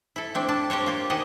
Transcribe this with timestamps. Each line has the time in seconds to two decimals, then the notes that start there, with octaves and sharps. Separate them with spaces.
0.16 E4 A4
0.34 A3 C4 D4
0.48 D4 A5
0.70 G4 A#4 C5 C#5
0.86 A#3 F4 G4
1.10 D#3 G4 C5 D#5 F#5 G#5